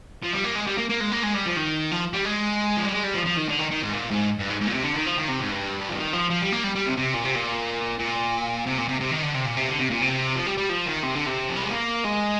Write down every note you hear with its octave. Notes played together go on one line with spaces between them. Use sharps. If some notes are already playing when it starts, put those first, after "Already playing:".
F3
G3
A#3
G#3
G3
A#3
A#3
G#3
A#3
G#3
G3
F3
D#3
F3
G3
G#3
F3
G3
G#3
G3
F3
F3
D#3
D3
D#3
D#3
G#2
A#2
G#2
G2
G#2
G#2
A#2
C3
D3
D#3
F3
D#3
C3
G#2
G2
G3
F3
D#3
F3
F3
G3
A#3
G3
G3
C3
C3
A#2
C3
A#2
A#2
C3
A#2
C3
C3
D#3
D3
C3
A#2
C3
D3
C3
A#2
C3
F3
G3
G3
F3
D#3
C3
D3
C3
F3
G3
G#3
A#3
G#3